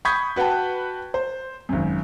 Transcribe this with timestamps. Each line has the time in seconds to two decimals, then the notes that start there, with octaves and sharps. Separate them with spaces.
0.05 B5 C#6 D#6 G6 G#6 B6
0.36 F#4 B4 F#5 G5 A5
1.14 C5
1.69 G#1 F#2